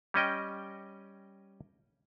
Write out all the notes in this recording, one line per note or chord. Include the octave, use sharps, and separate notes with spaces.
G3 C#4 D#5 G5